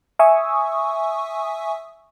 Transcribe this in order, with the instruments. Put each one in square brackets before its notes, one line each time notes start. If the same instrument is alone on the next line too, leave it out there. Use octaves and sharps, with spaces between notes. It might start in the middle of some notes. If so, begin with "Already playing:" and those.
[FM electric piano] E5 G#5 C#6 D#6 E6